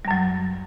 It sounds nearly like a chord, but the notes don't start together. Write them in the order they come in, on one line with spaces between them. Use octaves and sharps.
G3 F#2 F#3